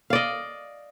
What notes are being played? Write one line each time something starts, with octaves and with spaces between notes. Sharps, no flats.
D5 D#5 F5